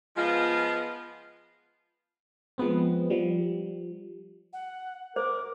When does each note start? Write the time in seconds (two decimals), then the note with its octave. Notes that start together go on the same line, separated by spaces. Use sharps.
0.17 F3 G#3 B3 F4
2.58 F3 G#3 B3 C4
3.10 F3 G3
4.53 F#5
5.16 A#4 C5 D6